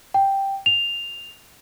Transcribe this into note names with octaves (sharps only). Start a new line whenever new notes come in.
G5
F7